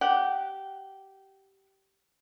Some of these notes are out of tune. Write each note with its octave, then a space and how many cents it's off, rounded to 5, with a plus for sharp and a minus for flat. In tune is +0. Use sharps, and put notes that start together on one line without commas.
G4 -15 F#5 +0